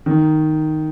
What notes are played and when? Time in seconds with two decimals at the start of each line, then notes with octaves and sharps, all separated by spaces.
0.06 D#3